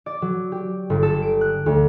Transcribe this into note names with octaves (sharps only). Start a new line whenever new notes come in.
D5
F#3
G4
G1
A4
D7
F#6
D2